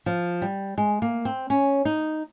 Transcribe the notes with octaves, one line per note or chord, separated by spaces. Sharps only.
F3
G3
G#3
A#3
C4
C#4
D#4